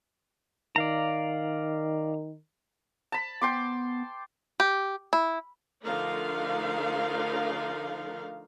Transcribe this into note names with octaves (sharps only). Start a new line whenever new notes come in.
D#3 D5 F5 A#5
A5 B5
B3 G5 C6 D6
G4
E4
D3 F3 A3 D#4 A#4 F5